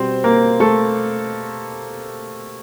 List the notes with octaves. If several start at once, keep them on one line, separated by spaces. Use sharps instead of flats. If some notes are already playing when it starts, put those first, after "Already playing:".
Already playing: B2 G3 C4 C5
A#3 A#4
A3 A4